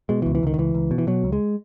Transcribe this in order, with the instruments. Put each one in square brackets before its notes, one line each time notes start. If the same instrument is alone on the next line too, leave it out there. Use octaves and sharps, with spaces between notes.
[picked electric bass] B2 G#3
E3
C#2
E3
C#2 D#3
D#3
C#2 E3
C#2
B2
E3
B2 F#3
C#2
G#3